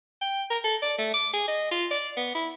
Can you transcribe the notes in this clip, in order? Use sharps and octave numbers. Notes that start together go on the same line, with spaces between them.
G5
A#4
A4
D5
A3
D6
G#4
D#5
F4
D5
B3
E4